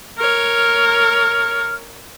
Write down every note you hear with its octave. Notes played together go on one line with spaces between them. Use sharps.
A#4 C#5 F6